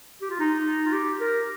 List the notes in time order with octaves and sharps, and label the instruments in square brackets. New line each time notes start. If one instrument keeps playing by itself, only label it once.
[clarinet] G4
F4
D#4
F4
G4
A#4